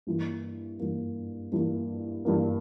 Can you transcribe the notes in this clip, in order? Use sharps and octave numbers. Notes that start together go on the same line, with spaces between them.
G2 E3 A#3
G2 E3 A#3
G2 E3 A#3
G2 E3 A#3